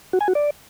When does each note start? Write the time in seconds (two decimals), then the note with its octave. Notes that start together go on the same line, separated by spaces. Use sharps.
0.13 F#4
0.21 G#5
0.28 F#4
0.35 D5